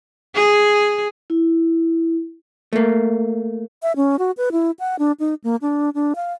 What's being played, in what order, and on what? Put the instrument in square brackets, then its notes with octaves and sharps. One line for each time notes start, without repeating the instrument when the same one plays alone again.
[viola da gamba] G#4
[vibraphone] E4
[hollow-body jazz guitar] A3 A#3
[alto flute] E5
C#4
F#4
B4
E4
F#5
D4
D#4
A#3
D4
D4
F5